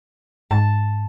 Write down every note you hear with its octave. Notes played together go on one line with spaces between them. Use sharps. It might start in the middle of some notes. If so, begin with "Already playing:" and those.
G#2 A5